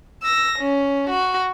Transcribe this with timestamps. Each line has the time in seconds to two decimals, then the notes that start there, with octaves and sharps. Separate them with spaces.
0.23 E6 A#6
0.59 C#4
1.10 F#4